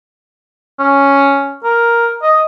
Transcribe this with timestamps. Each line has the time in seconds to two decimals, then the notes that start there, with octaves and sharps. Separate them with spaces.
0.79 C#4
1.64 A#4
2.23 D#5